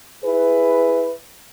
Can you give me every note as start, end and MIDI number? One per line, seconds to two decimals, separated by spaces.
0.24 1.11 64
0.24 1.11 68
0.24 1.11 71